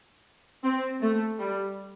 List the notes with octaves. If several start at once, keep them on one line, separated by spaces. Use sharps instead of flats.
C4
A3
G3